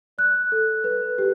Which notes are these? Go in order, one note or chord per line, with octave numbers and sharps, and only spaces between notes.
D5 F#6
A4
B4
G4